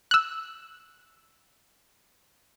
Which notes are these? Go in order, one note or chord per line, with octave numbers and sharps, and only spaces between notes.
E6 F#6